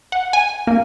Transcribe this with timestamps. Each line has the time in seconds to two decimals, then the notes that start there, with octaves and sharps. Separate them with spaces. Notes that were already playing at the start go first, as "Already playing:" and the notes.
0.12 F#5
0.33 G#5
0.67 A#3